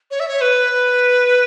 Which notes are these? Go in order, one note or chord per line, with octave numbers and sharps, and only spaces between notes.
C#5
E5
C#5
B4